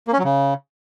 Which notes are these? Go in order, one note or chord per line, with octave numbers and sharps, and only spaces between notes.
A#3
C#4
F#3
C#3